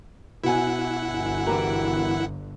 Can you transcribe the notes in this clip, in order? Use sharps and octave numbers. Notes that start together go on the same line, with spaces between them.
B2 E4 F#5 G#5
G1 D3
E3 G4 A#4